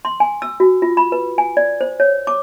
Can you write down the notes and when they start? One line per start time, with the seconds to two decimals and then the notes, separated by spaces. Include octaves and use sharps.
0.05 C6
0.20 G#5
0.42 E6
0.60 F#4
0.82 F4
0.97 B5
1.12 B4
1.38 G#5
1.57 D5
1.81 C5
2.00 C#5
2.27 D6